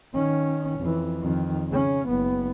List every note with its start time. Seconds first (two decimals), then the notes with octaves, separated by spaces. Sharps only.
0.14 D#3 C#4
0.80 F2 E3
1.21 F2 D#3
1.70 C#3 C#4
2.08 F#1 B3